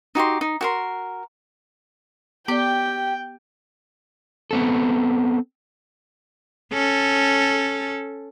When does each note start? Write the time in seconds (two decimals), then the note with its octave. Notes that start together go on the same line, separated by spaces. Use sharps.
0.15 D#4 F#4 G4 C6
0.41 D#4
0.61 F#4 A#4 C6
2.48 B3 G4 D5 G5
4.51 B3 C4 A4
6.73 C#4 A4